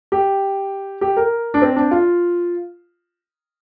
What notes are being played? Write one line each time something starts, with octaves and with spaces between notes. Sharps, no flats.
G4
G4
A#4
D4
C4
D4
F4